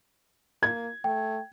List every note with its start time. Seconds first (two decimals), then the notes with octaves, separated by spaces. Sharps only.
0.63 A#3 G#6
1.04 A3 G5